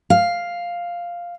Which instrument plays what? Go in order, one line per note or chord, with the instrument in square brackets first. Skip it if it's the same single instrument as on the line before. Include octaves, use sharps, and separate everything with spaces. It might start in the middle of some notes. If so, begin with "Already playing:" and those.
[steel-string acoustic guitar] F5